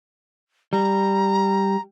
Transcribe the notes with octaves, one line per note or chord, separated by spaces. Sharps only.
G3 A#5